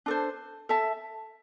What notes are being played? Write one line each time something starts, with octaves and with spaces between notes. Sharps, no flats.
D4 A4 C5
A4 E5 A5